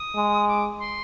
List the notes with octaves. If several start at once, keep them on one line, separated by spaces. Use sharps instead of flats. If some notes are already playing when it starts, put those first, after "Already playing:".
Already playing: D#6
G#3
D6
C6